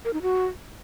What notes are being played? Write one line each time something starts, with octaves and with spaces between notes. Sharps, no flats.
A#4
D#4
F#4